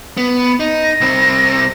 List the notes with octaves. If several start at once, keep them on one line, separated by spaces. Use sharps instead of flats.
B3
D#4
A#6
C2 C4